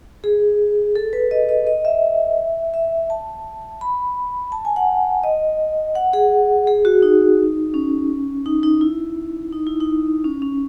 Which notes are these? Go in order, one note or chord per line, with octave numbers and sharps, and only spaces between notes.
G#4
A4
B4
D#5
D#5
D#5
E5
E5
A5
B5
A5
G#5
F#5
D#5
F#5
G#4
G#4
F#4
D#4
C#4
D#4
D#4
E4
D#4
E4
D#4
C#4
C#4